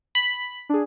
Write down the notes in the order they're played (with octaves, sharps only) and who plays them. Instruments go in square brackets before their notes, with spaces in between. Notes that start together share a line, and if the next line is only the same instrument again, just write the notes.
[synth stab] B5
[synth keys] D4 G#4